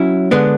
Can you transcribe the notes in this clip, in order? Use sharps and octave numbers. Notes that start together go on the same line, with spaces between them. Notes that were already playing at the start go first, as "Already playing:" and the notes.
Already playing: F#3 C#4 E4
D3 G#3 B3 D4